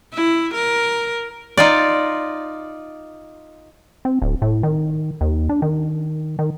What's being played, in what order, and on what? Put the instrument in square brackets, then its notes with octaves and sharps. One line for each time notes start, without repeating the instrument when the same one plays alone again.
[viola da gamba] E4
A#4
[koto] D#4 F4 D5
[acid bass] C4
D1
A2
D#3
D#2
D4
D#3
D#3